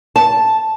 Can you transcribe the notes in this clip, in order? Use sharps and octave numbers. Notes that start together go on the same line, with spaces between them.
A5